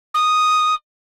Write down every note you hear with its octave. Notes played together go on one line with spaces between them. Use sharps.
D#6